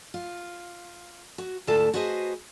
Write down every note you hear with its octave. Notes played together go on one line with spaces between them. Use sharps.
F4
F#4
D2 G#2 E4 F4 A4 A5
F#4 G#4 B4 C5 D#5